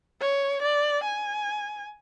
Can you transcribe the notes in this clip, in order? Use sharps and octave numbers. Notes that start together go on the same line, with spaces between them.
C#5
D5
G#5